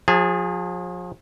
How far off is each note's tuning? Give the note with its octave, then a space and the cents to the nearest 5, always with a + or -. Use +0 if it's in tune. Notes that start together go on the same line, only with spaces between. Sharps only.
F3 +40 G#4 -20 A5 +0